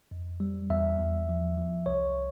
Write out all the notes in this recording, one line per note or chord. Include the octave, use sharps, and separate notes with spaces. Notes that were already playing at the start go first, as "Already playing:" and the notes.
F2
G3
E2 E5
E2
F3
F3
C2 C#5